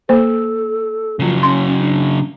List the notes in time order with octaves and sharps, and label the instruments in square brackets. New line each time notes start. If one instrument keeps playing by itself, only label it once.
[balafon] A#3 C5 [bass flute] A4
[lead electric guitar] C#3 F#3 [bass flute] F3
[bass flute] C#4 [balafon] C6
[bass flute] D4